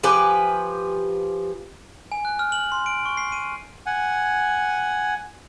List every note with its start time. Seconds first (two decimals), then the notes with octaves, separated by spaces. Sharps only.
0.03 F3 G4 B4 G#5
2.12 G#5
2.25 F#6
2.39 F6
2.52 F#7
2.72 C6
2.86 D7
3.06 C#6
3.17 C7
3.32 D#7
3.86 F#5 G#5